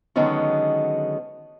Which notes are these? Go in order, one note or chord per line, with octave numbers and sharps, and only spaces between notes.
D3 D#3 F#3 G#3 B3 C#4